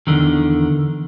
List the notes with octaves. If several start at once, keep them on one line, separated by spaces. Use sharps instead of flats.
E2 A2 D3 D#3